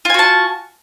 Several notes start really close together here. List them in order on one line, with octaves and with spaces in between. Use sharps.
F4 G#5 F#4 A5